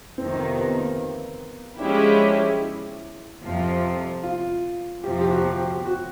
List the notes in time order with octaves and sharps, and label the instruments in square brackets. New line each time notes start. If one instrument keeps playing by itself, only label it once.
[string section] F2 C3 D#3 [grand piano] C4
[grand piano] B3
B3
A#3
[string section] F3 G#3 C#4 E4 G4 [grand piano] D4
[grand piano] E4
[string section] F2 C3 F3
[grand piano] F4
[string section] F2 C3 F3 [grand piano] G4
[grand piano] G4
F#4
G4
F#4